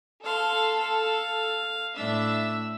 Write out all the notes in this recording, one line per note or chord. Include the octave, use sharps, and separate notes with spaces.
A4 F5 C6
F5
A2 D4 E5